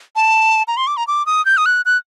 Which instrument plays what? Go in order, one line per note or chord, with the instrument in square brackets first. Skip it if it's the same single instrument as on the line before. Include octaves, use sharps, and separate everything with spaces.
[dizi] A5
A#5
C6
D6
A#5
D6
D#6
G6
D#6
F#6
F#6